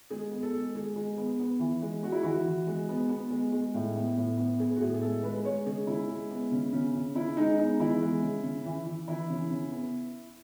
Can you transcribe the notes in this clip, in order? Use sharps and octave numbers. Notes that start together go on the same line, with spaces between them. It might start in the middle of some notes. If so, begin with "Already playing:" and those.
G#3 G#4
B3
A4
G#3
G#3 G#4
G#3
B3
B3
E3
G#3
G#3 F#4
E4
E3 F#4
E3
G#3
B3
B3
G#3
G#3
A2
B3
A2
B3
B3 G#4
F#4
A2 G#4
G#4
G#3 A4
G#3 B4
G#3 C#5
C#3 G#4
C#3 E4
G#3
B3
C#3
C#3
C#3
C#3 E4
G#3 D#4
B3 D#4
E3 E4
G#3
C#3
C#3
E3
E3
E3 E4
C#3
C#3
B3